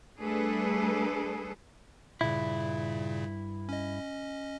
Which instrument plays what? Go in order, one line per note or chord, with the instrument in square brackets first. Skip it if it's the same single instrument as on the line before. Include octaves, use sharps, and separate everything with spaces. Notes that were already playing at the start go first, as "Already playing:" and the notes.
[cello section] G3 A3 D4 G#4 A4 B4
[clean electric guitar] G2 E4 [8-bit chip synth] A#2 C#3
[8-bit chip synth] C#4 D#5